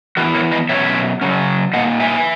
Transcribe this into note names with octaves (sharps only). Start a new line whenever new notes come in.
E3 B3 E4 F#4 A#4
A#4 C#5
B4 D#5
B2 F#3 C#4 C#5 E5
C#3 F#3 C#4
A#2 A#3 D#4 D#5 F#5
E5 G#5